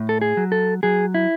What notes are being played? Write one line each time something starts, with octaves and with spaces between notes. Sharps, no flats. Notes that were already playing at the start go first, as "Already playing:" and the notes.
Already playing: A2
A4
G#4
F#3
A4
F#3 G#4
E4